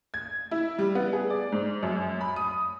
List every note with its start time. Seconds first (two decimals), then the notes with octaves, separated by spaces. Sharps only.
0.14 G#6
0.51 E4
0.79 G3
0.95 B3
1.13 G#4
1.30 D5
1.52 G#2
1.83 F#2
2.21 B5
2.36 D#6